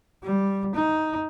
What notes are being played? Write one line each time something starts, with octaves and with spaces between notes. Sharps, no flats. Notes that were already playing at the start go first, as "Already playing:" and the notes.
G3
D#4